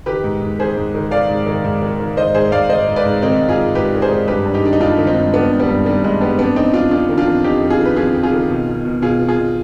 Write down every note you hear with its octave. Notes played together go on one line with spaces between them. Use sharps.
D#3 G4 B4
G#2
G#2
D#3 G#4 C5
G#2
D#3
D#3 D5 F5
G#2
D#3
G#2
D#3
D#3
G#2 C5 D#5
G#2 G#4 C5
G#2 D5 F5
G#2 C5 D#5
G#2
B4 D5
G#2
D#3 C4 D#4
G#2
F4 G#4
G#2
G#2 G4 B4
D#3
G#4 C5
G#2
G2 G4 B4
G2
D#4 G4
D#3 D4
D#4
G2 D4 F4
D#3
C4 D#4
G2
D#3 B3 D4
G2
G3 B3
G2
D#3 G3
G2 G#3
G2 G3 B3
F2 B3 D4
F2 C4 D#4
F2 D4 F4
F2 D4 F4
D#3
D4 F4
F2
F2 D#4 G4
F2
F4 G#4
D#3
B4
F2 F4 G#4
F2
F4 G#4
D#3
B2
B2
B2
B2 F4 G#4
B2
F4 G#4
B2